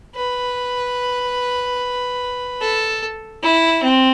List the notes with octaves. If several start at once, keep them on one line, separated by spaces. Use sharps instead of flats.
B4
A4
E4
C4